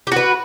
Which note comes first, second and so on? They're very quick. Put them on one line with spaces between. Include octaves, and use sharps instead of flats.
G4 F#4 B4